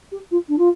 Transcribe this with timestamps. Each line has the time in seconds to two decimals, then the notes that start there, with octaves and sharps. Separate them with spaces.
0.12 G4
0.31 F4
0.49 D4
0.58 F4